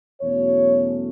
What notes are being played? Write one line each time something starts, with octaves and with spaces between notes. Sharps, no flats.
E2 B2 F#3 A3 C#4 C#5